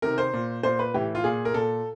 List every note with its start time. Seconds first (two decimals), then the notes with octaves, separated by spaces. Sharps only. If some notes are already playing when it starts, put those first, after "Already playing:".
0.02 C3 D#3 A#4
0.18 C5
0.33 A#2
0.63 A#2 C5
0.79 B4
0.94 A2 E3 G4
1.15 F4
1.24 A#2 G#4
1.45 A#4
1.54 A#2 A4